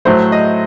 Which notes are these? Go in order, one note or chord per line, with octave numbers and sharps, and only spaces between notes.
A2 F#3 A3 C5
D#5